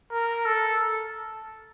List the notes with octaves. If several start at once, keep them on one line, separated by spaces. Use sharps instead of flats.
A#4
A4